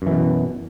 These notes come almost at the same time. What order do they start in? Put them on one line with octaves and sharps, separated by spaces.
F#2 E3 B2